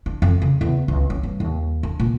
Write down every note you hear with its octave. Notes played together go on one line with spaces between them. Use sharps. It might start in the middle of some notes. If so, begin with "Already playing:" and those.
D4
F2
C#3
E2
C#2
C#4
G2
D#2
D4
A#2